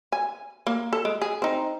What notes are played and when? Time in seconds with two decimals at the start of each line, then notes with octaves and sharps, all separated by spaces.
0.12 G#5
0.67 A#3
0.93 A4
1.05 G#3
1.22 G#4
1.42 C4 D#4